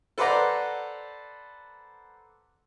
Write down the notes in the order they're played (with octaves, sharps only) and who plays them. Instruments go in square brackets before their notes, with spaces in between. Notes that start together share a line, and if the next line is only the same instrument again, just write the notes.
[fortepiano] A4 B4 C5 D5 F#5 A#5